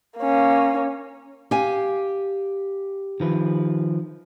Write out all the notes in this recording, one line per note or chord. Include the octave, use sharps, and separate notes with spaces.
A#3 C#4
G4 F5 G#5
D#3 F3 B4